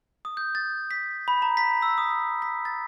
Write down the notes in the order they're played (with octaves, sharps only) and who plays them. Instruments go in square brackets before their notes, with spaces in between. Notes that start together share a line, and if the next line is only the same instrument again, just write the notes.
[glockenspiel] D#6
G6
A6
B6
B5
A#5
B6
E6
D#6
B6
A6